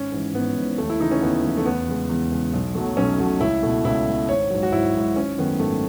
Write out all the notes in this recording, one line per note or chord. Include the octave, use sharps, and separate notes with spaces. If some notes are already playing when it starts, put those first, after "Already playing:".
Already playing: G#1 C#4
G#2 E3
G#1 B3
G#2 E3
D#2 A3
E4
C#3 E3 A3 D#4
C#4
D#2 B3
C#3 E3 A3
A3
E2 B3
C#3 G#3
E2
C#3 G#3
B1
B2 F#3 A3
B1 C#4
B2 F#3 A3
C#2 E4
B2 A3
C#2 E4
B2 A3
G#1 C#5
G#2 F#3
F#4
G#1 E4
G#2 F#3
G#1 C#4
F#2 D#3 A3 B3
G#1 A3